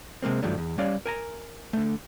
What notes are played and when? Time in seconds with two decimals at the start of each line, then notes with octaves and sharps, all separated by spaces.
0.22 C3 G#3 A#3 C4
0.43 G2 D#3 F3 F#3 A3 D4
0.58 E2
0.78 G3 C#4 C#5 D5 F5
1.06 A#4 G#5 A#5
1.73 D3 A3